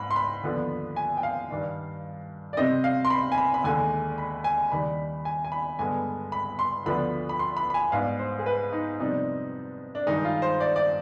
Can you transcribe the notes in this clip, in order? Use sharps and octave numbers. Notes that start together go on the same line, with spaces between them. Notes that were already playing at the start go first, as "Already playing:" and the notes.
Already playing: G#2 B5
C6
B5
D#2 D3 F3 B3 D4
G#5
G5
F5
G2 D#3 G3 D4
D5
C3 G3 C4 D#5
F5
C6
B5
G#5
B5
B5
D#2 D3 G#3 G#5
B5
G#5
D#2 D#3 G3 D4 B5
G#5
G#5
B5
G2 D3 G#3 B3 G#5
B5
C6
D2 D3 F3 B3 D4 B5
B5
C6
B5
B5
G#5
G#2 G3 B3 D4 F5
C5
G#4
B4
D#4
F2 C3 G3 B3 D4 D#4
D4
G2 D#3 G#3 D#4
F4
C5
D5
D5